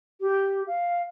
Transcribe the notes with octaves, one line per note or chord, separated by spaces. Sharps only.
G4
F5